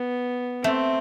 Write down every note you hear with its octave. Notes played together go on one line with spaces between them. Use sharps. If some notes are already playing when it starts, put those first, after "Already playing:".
Already playing: B3
A3 C4